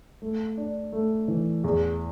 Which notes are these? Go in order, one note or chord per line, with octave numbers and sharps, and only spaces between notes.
A3
D4
A3
E3
E2